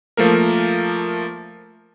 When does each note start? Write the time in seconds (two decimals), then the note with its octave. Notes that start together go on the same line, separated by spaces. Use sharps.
0.17 F3 A3 A#3 A#4